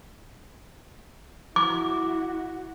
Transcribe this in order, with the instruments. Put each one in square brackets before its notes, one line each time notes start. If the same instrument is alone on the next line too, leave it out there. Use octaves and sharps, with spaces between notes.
[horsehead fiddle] E4 F#4 [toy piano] D6